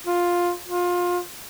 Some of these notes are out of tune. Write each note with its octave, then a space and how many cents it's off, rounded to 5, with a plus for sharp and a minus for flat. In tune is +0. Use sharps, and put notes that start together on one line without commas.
F4 +10
F4 +25